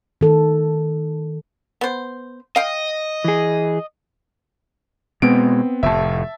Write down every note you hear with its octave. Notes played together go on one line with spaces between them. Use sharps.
D#3 A4
B3 C5
D#5 F5 G5
E3 G#4
B2 G#3 B3 C4 D7
F1 A2 E5 A5